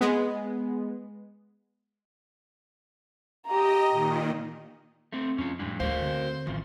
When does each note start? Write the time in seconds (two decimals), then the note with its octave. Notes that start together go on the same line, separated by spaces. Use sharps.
0.01 G#3 B3
3.47 G4 D#5 A#5
3.91 A#2 D#3
5.12 A3 C4
5.38 F2 C#4 F4
5.59 A2 F3 G3 G#3 D4
5.80 D2 F#4 A#4 C5 F5
6.01 D3 C4
6.47 A1 D#3 F3